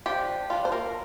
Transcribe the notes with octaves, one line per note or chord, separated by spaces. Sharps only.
F3 D4 G4
G3 D4 F4
C5
A#3 A#4